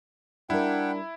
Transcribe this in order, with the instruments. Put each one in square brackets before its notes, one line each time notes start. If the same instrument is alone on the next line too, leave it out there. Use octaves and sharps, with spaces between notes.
[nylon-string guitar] G3 A#4 [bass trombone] D4 [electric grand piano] E4 [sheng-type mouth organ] F#5 G5